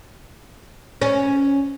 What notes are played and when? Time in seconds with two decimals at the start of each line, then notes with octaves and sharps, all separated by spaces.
1.01 C#4